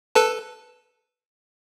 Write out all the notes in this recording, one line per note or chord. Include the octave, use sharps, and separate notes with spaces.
A4 B4 A5